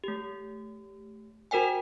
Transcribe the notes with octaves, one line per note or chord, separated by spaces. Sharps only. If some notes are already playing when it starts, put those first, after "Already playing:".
A3 G4
F#4 A#4 C5 G5 G#5